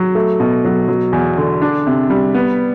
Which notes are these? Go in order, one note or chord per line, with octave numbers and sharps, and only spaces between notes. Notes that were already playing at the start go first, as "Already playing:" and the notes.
Already playing: F#3
A3
B2
F#3
F#3
E2
D3
D4
C3
G3
B3